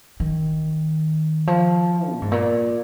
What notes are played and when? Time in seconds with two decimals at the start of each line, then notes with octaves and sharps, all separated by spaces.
0.20 D#3
1.47 F3
2.12 A#2
2.21 G#2
2.32 A#2